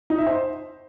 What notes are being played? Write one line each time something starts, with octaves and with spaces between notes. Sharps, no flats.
D#4
E5
C5